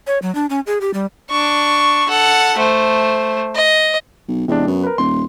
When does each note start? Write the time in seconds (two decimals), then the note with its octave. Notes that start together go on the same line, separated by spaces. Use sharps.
0.07 C#5
0.22 F#3
0.35 D4
0.50 C#4
0.67 G#4
0.81 G4
0.94 G3
1.30 D4 C#6
2.09 A4 F#5
2.57 A3 C5
3.55 D#5
4.28 B1
4.48 E2 C3 G#3 D4
4.67 F#2 B3
4.83 A#4 B4
4.98 D#1 C6